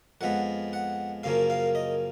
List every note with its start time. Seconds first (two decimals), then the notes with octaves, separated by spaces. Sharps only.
0.21 F2 F3 G#3 B3 F#5
0.73 F#5
1.23 F#2 C#3 F3 A#3 F5
1.50 F5
1.75 D#5